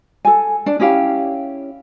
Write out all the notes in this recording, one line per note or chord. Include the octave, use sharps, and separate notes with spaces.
A4 G#5
D4
C#4 E4 G4 F5